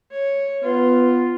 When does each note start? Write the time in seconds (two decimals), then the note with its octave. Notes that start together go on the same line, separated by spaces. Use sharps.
0.11 C#5
0.63 B3 F4